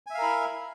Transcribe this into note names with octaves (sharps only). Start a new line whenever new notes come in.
E4 A#4 E5 F5 G#5